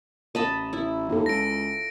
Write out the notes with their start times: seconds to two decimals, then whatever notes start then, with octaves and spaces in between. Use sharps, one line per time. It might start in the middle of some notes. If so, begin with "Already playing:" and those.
0.35 A1 D#5 A5 B5
0.73 E4
1.09 D#2 F4 A4
1.26 C#2 A#6 D7